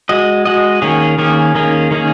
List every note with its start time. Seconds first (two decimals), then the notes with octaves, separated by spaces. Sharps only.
0.09 G#3 F#4 D#5
0.45 G#3 F#4 D#5
0.82 D#3 A#3 C#4 G#4
1.18 D#3 A#3 C#4 G#4
1.55 D#3 A#3 C#4 G#4
1.91 D#3 A#3 C#4 G#4